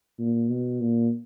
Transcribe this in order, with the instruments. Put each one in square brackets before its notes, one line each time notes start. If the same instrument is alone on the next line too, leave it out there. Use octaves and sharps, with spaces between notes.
[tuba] A#2
B2
A#2